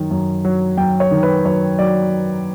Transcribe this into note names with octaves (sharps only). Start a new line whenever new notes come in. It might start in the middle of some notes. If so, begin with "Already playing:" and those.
Already playing: F#2 D#3
F#2
F#3
F#2 G5
C#5
D#3
B4
F#2 C#5
F#3 D5